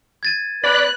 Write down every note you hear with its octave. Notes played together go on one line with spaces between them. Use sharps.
G#6 A6 D#7
B4 D5 B5 F#6